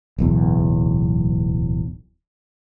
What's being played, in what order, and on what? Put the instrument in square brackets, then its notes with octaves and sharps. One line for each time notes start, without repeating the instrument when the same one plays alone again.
[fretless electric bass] D1 B1 E2